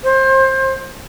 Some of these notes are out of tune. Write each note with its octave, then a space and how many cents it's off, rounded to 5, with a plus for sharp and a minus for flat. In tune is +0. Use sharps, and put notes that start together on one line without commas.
C5 +25